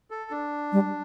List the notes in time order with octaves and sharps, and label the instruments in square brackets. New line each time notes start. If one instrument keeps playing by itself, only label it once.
[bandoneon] A4
D4
[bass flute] G3